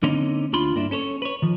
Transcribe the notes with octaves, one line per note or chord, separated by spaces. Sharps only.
D3 A#3 C4 C#4 D#4
D2 D4 F4 B5 C6
G2 A#3 D4 E4
C#4 A4 C5 C#5
B4 C#5
D#3 F3